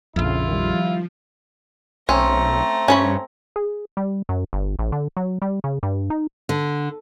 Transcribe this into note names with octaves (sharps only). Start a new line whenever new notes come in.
A#1 F2 C#3 E4 F4
D#3 F3 G3
B1 A3 C4 C#4 A#5
G2 C#4 C#5 B5
G#4
G3
F#2
G1
A1
D3
F#3
G3
C#3
G2
D#4
D3